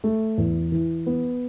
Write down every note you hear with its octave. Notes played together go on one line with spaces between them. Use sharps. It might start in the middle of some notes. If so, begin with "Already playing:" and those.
A3
E2
E3
B3